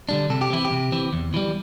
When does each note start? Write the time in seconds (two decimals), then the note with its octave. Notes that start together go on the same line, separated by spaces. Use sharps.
0.09 D3 G3 D4
0.30 C3 A4
0.41 G4
0.50 E3 C4 E4
0.65 G4
0.72 C3
0.92 E3 C4
1.13 E2
1.34 E3 G3